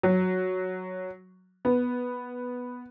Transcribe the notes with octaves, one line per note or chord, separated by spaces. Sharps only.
F#3
B3